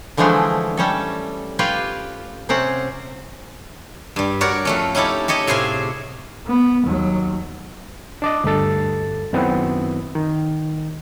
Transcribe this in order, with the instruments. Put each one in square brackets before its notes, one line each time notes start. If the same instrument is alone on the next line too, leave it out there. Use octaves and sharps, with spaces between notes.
[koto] D3 E3 F3 G#3 A3 D4
G3 C#4 A4
F4 G4 B4 C#5
C3 C4 C#4 F#5
[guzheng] G2 G3
F#4 A#4 C#5 D5
F2 A3 C#4
C#4 D#4 E4 G4 A4
G4 A4 C#5 D#5
A2 C3 G#4 C5 F5 G#5
[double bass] B3
D#2 F#3
[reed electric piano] D4 D5 D#5
D2 G2 A4 A6
F#2 D#3 B3 C4 E4
D#3